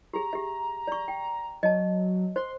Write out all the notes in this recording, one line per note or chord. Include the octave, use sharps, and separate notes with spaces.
G4 G#4 A#5
G4 E5
D5 A#5 C#6
G5
F#3 D#5 A5
C5 C6